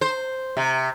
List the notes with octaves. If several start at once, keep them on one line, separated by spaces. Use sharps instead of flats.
C5
C3